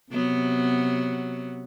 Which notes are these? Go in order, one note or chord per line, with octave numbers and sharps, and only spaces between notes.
C3 F#3 B3